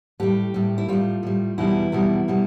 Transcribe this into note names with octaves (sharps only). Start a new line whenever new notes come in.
A2 G3 G4
A2 G3
E4
A2 G3 F4
A2 G3
E2 B2 G3 E4
E2 B2 G3
B2 G3